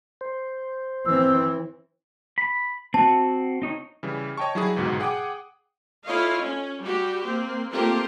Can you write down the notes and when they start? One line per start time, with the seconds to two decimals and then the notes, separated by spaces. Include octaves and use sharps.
0.21 C5
1.06 E3 C4 E6
2.38 B5
2.94 C4 F#4 A5
3.62 C4 D#4 C#5
4.03 C#3 E3 G3
4.37 C#5 D#5 G5 A5 C#6
4.55 F#3 G3 E4 F#4 G#4
4.76 G1 C#2 G#2 B2 F#4
5.00 G#4 F#5 G5 D6 D#6
6.05 E4 F4 A4 C#5 D#5 F5
6.42 C#4
6.81 G3 F#4 G4
7.24 A#3 C4
7.72 A3 A#3 C4 F4 G4 A#4